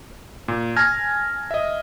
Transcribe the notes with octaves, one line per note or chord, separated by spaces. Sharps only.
A#2
G#5 A5 F6 G#6 A#6
D#5 E5